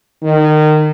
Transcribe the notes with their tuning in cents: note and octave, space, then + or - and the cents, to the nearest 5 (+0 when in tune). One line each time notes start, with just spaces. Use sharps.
D#3 -25